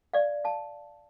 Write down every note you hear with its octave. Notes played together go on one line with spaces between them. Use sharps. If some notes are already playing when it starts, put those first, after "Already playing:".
D5 F5
F5 A5